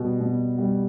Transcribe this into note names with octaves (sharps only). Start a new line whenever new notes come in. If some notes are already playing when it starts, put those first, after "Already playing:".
Already playing: B2 G3 B3
B2
G3